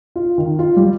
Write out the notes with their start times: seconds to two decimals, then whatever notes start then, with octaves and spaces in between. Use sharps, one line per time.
0.16 F4
0.38 D#3
0.59 F4
0.76 G3